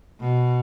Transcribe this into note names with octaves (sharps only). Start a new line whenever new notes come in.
B2